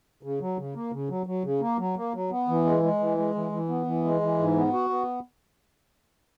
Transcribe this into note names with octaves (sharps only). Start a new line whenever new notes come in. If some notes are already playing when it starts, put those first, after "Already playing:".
C#3
F#3
C#3
A#3
C#3
F#3
F#3
C#3
A#3
F#3
A#3
F#3
B3
E3
G#3
G#3
E3
G#3
E3
E3
B3
E3
G#3
E3
G#2
B3
F#4
B3